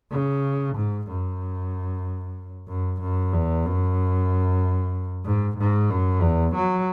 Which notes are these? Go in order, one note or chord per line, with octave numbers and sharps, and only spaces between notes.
C#3
G#2
F#2
F#2
F#2
E2
F#2
G#2
G#2
F#2
E2
F#3